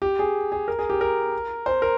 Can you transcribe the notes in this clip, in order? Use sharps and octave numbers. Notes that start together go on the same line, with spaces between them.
G4
G#4
G#4
A#4
G#4
G4
A#4
C5
A#4